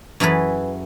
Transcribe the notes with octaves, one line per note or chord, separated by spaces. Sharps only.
F#2 E3 G#4 A4 B4